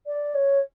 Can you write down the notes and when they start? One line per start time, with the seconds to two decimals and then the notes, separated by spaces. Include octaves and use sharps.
0.07 D5
0.35 C#5